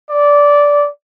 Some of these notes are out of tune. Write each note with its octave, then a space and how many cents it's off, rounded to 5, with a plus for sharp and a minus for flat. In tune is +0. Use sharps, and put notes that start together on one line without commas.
D5 -15